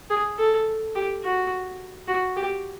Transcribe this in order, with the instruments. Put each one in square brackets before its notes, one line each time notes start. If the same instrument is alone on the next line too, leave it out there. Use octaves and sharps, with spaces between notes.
[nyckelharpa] G#4
A4
G4
F#4
F#4
G4